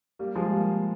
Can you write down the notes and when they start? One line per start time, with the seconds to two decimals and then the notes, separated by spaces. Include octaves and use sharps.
0.19 G3 A#3
0.35 F3 G#3
0.51 G3 A#3